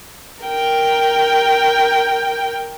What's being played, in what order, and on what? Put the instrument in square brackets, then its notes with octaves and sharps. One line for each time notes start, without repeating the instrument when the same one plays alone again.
[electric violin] A#4 G5